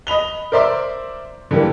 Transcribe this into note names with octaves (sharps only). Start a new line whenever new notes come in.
D#5 B5 F7 G7
A#4 C5 D5 E5 C6 D6
D3 E3 G3 A#3